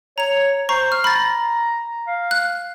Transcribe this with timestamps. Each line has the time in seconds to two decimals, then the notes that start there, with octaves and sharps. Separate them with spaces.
0.18 C#5 A#5 F7
0.69 C5 A#5 C#6
0.92 F6
1.04 A#5 B5 A6
2.07 F5
2.31 F#6